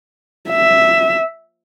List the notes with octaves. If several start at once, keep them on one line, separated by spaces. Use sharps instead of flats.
E5